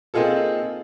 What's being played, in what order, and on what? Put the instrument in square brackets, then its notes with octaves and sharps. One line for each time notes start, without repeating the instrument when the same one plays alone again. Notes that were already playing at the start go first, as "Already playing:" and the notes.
[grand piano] A#3 C4 D#4 F4 G#4 A4